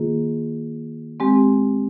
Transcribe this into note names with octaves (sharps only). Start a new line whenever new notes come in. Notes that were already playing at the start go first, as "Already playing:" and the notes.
Already playing: D#3 A#3 F4 G#4
G#3 C4 G4